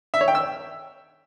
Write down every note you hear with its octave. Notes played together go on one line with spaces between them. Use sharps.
E5
C#5
G5
E6